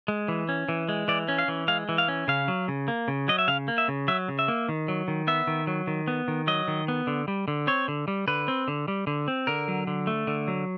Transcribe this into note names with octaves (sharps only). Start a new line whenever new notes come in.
G#3
E3
C#4
E3
G#3
E3 D5
C#4
F5
E3
G#3 F5
E3
F5
C#4
C#3 F5
F#3
C#3
A#3
C#3
F#3 D#5
E5
C#3 F5
A#3
E5
C#3
F#3 E5
C#3
E5
A#3
D#3
F#3
D#3
B3 E5
D#3
F#3
D#3
B3
D#3
F#3 D#5
D#3
B3
D3
G3
D3
C4 C#5
D3
G3
D3 B4
C4
D3
G3
D3
C4
D3 A#4
F#3
D3
A3
D3
F#3